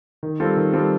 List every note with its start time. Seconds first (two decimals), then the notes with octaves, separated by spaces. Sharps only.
0.23 D#3
0.40 G3 C4 F4 A4
0.57 D#3
0.73 G3 C4 F4 A4